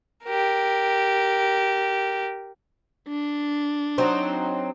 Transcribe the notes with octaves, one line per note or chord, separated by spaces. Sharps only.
G4 A#4
D4
F#3 C4 D#4